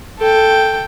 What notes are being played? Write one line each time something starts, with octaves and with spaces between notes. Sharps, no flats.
A4 G5